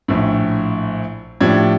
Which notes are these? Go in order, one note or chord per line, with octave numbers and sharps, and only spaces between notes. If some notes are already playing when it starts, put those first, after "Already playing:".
A#1 A2
A2 F3 D4 G4 G#6